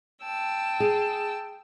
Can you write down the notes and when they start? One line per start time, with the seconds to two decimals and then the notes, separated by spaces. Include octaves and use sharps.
0.22 G5 A5 E6
0.80 G#4